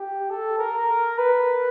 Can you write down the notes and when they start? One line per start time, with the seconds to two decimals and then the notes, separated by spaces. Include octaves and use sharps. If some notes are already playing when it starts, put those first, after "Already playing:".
Already playing: G4
0.30 A4
0.58 A#4
1.18 B4